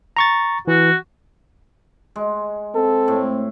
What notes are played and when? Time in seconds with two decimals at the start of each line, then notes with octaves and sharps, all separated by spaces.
0.17 A#5 C#6 A6
0.68 E3 F#4
2.16 G#3
2.75 C4 A4
3.08 A2